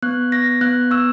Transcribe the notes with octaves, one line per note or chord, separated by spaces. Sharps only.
B3 F#6
B3 A#6
B3 F#6
B3 E6